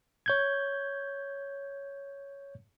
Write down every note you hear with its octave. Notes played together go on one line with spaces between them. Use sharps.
C#5 G6 G#6